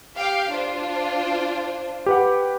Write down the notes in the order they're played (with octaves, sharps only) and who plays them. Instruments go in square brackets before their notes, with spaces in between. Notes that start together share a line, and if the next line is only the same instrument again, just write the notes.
[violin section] G4 F5 G5
D4 F4 C5
[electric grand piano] G4 B4 F#5